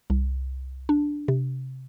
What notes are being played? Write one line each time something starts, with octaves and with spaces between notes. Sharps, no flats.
C2
D4
C3